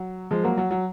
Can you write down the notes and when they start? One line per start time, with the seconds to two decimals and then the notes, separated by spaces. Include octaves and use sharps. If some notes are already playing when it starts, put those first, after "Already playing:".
Already playing: F#3
0.31 F3 G#3
0.44 F#3 A#3
0.57 F#3
0.71 F#3